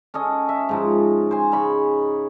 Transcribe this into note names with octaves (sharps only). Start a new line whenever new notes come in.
C#4 A4 D#5
E5
G#2 F3 A#5
C5 G#5
C#3 D#4 B5 C#6